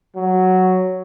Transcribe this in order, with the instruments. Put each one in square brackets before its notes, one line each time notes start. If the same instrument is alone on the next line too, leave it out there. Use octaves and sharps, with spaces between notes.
[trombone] F#3